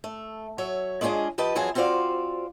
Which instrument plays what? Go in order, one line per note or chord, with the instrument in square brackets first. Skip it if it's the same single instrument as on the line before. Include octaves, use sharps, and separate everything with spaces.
[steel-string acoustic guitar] A3
F#3 C#5 E5
G#3 C#4 D4 F4 G#4 D#5
F3 G4 B4 D#5 A5
F2 E3 F#3 F4 G#4 A5
C4 F4 F#4 C5 D5 F5